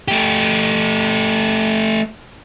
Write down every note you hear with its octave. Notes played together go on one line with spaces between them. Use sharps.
A3 G4